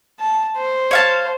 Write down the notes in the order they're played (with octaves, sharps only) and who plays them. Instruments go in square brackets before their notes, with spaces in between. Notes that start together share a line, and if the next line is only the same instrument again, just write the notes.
[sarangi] A5
C5
[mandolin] C#5 F5 A5